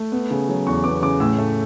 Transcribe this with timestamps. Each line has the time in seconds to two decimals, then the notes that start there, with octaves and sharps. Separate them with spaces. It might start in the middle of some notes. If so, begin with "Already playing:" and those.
Already playing: A3
0.12 B3
0.31 C#3
0.49 F#3
0.66 E2 C#6
0.84 B3 D6
1.02 C#3 D6
1.20 A2 E6
1.39 A3